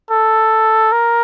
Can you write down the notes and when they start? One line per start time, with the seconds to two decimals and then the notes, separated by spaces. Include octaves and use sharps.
0.11 A4
0.92 A#4